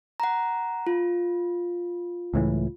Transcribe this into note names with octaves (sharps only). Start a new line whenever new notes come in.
F#5 A#5
F4
C#2 A2 E3